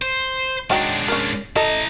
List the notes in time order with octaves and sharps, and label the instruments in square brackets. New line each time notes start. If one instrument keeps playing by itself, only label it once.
[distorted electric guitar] C5
[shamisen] D#3 F#3 G5 [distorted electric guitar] G#3 D4
[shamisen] C#4 A#4
[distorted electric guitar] E4 A#5 [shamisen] A4 D#5